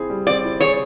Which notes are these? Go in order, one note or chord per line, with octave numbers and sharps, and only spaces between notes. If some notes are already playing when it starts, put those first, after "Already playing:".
Already playing: C4 E4 G#4
G3
C4 D5
E4
G#4 C#5